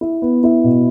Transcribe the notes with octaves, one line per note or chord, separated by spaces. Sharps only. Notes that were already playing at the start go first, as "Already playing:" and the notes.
E4
B3
E4
B2